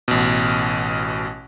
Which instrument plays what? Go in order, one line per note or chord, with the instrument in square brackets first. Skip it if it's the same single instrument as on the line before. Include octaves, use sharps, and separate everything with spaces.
[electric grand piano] A1 B2